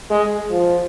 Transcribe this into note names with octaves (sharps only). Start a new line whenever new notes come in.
G#3
F3